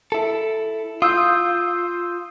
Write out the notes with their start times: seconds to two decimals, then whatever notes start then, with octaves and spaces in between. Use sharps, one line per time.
0.12 E4 A4
1.02 F4 D#6 E6 G6